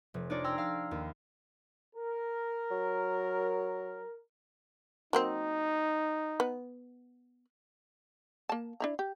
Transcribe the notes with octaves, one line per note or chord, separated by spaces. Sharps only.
F1
D4 D#4 F4 C#5 D5
G5 A#5 C6 E6 G#6
F5 E6 F6
D#2
A#4
F#3
F#3 A#3 C4 D#4
B3
A#3 A5
D4 E4 A#5
G4